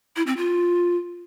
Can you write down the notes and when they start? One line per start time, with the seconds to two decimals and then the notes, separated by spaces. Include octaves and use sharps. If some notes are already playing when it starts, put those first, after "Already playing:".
0.16 E4
0.27 C4
0.37 F4